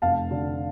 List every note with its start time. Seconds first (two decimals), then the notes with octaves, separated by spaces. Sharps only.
0.02 F1 F5 A5
0.31 D3